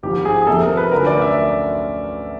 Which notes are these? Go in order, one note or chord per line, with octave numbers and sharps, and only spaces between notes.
G#1 G#2 F3 G4
G#4
G#4
F2 C3 F3 A4
A#4
B4
D2 D3 F#3 A3 C#4 A#4
D5
E5